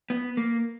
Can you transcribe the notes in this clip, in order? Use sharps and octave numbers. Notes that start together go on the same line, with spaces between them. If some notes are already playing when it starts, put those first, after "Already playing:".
B3
A#3